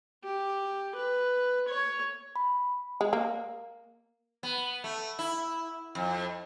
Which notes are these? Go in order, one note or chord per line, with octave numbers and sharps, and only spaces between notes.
G4
B4
C#5
B5
G#3
A#3
B3
A3
E4
F2